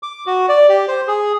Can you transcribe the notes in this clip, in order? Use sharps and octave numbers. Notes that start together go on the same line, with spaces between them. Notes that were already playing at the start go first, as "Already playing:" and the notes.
D6
F#4
D5
G4
C5
G#4